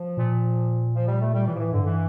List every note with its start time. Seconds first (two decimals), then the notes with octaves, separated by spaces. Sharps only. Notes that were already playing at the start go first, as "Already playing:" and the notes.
Already playing: F3
0.17 A#2
0.96 F3
1.08 G3
1.21 A3
1.34 G3
1.47 A2 E3
1.55 F3
1.59 E3
1.72 G2 D3
1.85 E3